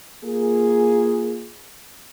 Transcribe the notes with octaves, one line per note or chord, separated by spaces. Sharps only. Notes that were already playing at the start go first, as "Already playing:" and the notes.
A#3 F4 G#4